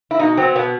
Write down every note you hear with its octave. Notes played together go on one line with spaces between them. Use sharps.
E4
B2 D#4
F#3 B3 C4
B2 B3